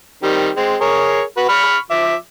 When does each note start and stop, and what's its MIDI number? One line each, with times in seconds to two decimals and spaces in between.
0.23 0.50 51
0.23 0.50 55
0.23 0.50 60
0.56 0.76 56
0.56 0.76 60
0.81 1.22 68
0.81 1.22 70
0.81 1.22 73
1.37 1.46 66
1.37 1.46 71
1.49 1.77 83
1.49 1.77 85
1.49 1.77 89
1.91 2.15 53
1.91 2.15 76
1.91 2.15 86